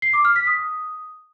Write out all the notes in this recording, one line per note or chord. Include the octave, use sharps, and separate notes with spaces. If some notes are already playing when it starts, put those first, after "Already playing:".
C7
D6
F6
B6
D#6